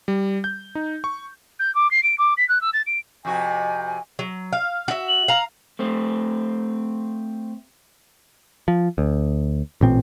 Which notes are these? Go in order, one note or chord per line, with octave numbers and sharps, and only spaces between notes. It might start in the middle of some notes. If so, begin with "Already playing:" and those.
G3
G6
D#4
C#6
G6
D6
C7
D7
D6
B6
F#6
E6
A6
D7
F2 C3 F#4 G#5
F#3
F5
F#4 E5
F#7
F5 A#5
A3 C4
F3
D2
A1 A#2 C4